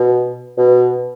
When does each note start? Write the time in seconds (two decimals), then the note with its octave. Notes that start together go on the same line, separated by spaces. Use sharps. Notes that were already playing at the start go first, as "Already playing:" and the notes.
Already playing: B2
0.58 B2